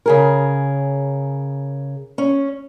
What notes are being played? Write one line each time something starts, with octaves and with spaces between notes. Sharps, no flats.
C#3 G#4 A#4
C#4